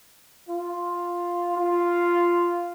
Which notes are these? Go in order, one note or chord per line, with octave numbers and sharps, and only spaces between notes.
F4
F4